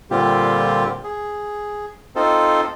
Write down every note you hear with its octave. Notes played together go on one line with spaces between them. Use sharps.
A#2 D3 G3 C4 F4 G4
G#4
C4 D#4 F4 A4 C5